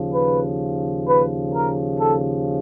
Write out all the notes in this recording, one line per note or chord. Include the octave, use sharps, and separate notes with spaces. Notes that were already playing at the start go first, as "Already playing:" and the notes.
Already playing: D#2 C#3 F3
B4
B4
A#4
A4